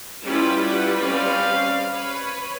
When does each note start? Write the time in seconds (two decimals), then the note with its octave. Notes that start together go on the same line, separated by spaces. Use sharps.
0.24 G3 C#4 E4 F4 B4
0.70 F#5
0.99 C4 C#4 D5 F5
1.92 B4 C#5